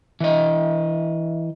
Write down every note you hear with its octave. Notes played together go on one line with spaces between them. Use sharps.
E3 D#5